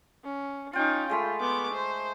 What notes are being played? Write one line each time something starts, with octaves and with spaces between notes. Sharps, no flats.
C#4
C#4 D#4 F4 G5
G#3 A3 F4 B5
B3 D6
C5